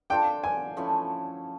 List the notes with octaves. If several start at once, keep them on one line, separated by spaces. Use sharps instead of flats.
D4 F4 A4 G5
G#5
F3 A3 C#4 E4